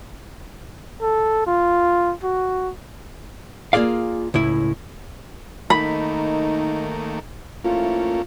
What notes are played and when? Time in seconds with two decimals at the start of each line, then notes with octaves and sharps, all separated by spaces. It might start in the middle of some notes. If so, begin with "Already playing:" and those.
1.01 A4
1.46 F4
2.23 F#4
3.73 A#3 F4 G#4 D5 F5
4.34 C#2 A2 E4
5.70 D#3 A3 A#3 D#4 B5
7.64 F2 A3 A#3 C#4 E4 F4